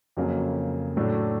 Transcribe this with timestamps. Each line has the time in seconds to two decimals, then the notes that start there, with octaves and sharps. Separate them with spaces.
0.17 F2 C#3 F#3 A#3 C#4
0.97 A2 F#3 A3 D4